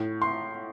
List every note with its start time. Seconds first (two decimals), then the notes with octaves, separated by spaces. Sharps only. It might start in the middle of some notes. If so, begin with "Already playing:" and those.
Already playing: A2
0.22 C6